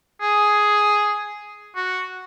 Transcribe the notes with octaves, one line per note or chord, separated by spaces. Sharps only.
G#4
F#4